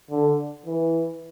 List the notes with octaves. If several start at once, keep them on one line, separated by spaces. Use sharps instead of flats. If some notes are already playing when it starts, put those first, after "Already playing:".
D3
E3